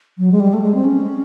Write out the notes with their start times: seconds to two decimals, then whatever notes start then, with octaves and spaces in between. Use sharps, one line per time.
0.18 F#3
0.32 G#3
0.40 G3
0.53 A3
0.62 G#3
0.75 C4
0.84 C#4